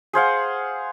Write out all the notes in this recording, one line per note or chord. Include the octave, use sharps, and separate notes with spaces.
G#4 C5 F5 F#5